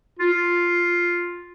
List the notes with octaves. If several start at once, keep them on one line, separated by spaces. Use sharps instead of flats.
F4